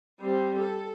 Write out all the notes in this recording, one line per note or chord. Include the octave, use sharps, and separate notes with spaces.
G3 C4
A4